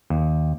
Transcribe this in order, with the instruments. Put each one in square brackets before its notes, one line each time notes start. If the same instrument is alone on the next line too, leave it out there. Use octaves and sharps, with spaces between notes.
[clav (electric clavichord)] D#2